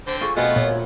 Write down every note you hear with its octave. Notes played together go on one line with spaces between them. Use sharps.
D3 C4 C5 G5
F4 G#4 A4 C#6
B2 A3 B3 C4 F4 F#5 G#5
A#2 A3 A#3 C#5